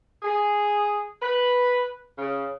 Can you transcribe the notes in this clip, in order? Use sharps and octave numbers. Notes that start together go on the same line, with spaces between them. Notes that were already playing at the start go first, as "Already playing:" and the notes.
G#4
B4
C#3